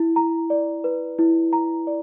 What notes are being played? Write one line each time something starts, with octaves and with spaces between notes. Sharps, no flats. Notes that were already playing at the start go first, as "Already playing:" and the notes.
Already playing: E4
A#5
D5
B4
E4
A#5
D5